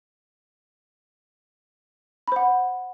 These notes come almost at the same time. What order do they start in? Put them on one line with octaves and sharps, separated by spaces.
B5 C5 F#5